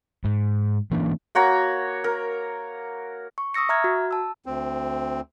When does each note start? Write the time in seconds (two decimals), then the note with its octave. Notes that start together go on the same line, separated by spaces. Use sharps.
0.24 G#2
0.91 E3 A#3 C#4 D4
1.35 A#3 F#4 C#5 A#5
2.04 A#4
3.38 C#6
3.54 C#6 D#6 E6 A#6 C#7
3.69 E5 A#5 F6 G#6
3.84 F#4
4.11 A5 E6
4.46 D2 C4